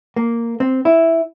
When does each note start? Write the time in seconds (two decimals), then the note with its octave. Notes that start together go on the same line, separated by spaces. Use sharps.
0.16 A#3
0.60 C4
0.85 E4